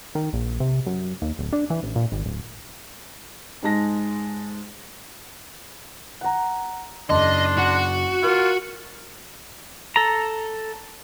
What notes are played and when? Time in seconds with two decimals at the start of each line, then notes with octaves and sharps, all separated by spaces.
0.15 D#3
0.33 A#1
0.60 C3
0.86 F#2
1.22 D#2
1.39 D1
1.53 D4
1.70 E3
1.83 A1
1.96 A#2
2.12 G#1
2.25 D1
3.62 G#2 G#3 A5 A#6
6.21 F#5 A#5
7.10 F#1 D4 D#5 C6
7.58 F#4
8.23 F4 A#4
9.96 A4 A#5